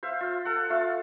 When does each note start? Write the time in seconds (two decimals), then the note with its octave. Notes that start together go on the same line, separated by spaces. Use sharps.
0.03 C5 E5 F5
0.21 F4
0.45 A4 F#5
0.70 A3 F4 F5